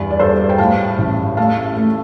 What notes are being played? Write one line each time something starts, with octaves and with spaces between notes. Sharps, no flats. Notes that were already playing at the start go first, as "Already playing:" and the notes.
Already playing: E2 G2 B4 D5
D5
G2 A4 C5
G5
A2 F5 A5
A1
A3 F5 A5
A3